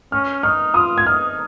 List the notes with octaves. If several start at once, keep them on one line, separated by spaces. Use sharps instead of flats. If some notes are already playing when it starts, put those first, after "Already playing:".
C#4 F6
D#4 F6
F4 D#6
G#6
D#4 F6